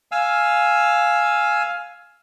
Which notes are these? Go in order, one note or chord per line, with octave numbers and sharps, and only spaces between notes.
F5 G#5 E6